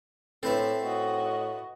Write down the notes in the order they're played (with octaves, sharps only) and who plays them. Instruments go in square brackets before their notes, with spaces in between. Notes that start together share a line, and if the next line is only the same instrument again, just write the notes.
[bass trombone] A2 [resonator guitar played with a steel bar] C4 [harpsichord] A4 B4 E5
[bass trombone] A2 [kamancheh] F#4 D#5